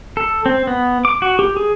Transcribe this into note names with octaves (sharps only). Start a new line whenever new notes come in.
A4
C4
B3
D6
F#4
G4
G#4